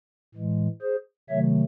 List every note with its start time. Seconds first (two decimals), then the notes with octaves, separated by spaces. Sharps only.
0.35 A2 E3 G#3
0.82 G#4 C5
1.29 C3 D#3 F#3 A3 C#5 E5